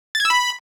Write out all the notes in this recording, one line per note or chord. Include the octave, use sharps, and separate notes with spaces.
A6
G#6
E6
B5